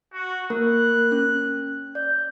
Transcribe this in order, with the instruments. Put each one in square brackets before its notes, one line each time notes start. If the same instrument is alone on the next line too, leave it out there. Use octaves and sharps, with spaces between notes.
[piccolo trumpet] F#4
[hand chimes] A#3 A#4 [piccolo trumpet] F#6
[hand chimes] C#4
[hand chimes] D5 [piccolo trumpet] G6